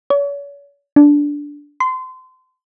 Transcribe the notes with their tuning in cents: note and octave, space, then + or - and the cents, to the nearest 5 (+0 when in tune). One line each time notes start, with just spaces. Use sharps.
C#5 +40
D4 -10
C6 -30